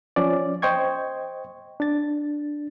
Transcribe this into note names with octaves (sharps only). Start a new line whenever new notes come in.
F3 C#4 D5
C5 D#5 G5 C#6 G#6
D4 A6